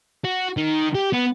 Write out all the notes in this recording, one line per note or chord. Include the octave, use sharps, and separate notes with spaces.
F#4
D#3
G4
B3